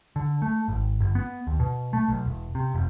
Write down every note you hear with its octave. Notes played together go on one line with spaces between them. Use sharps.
D3
A3
G#1
G1
B3
D#2
B2
A3
B1
E1
C3
F1